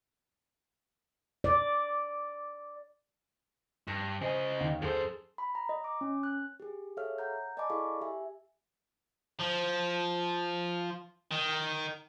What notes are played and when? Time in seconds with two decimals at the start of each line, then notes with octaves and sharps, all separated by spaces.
1.44 D5
3.88 G2 A#6
4.21 C#3 C5 D#5 G#5
4.60 D#2 D#3
4.82 F#2 G#4 A4 C5
5.38 B5
5.55 A#5
5.69 D#5
5.84 D6
6.01 C#4
6.23 F#6
6.60 G4 G#4
6.97 G#4 A4 C#5 E5 F5 F6
7.18 F#5 A#5 G6
7.57 D5 D#5 G#5 A5 B5 D6
7.70 E4 G#4 A4 F5 B5 C#6
8.01 G4 E5 G#5
9.40 F3
11.31 D#3